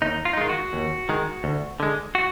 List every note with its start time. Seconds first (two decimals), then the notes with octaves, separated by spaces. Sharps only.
0.02 D#2 D#4
0.25 F4
0.33 D#4
0.37 D#3 G#3 F4
0.49 F#4
0.73 D#2
1.09 D#3 G#3
1.44 D2
1.80 D3 G#3
2.15 F#4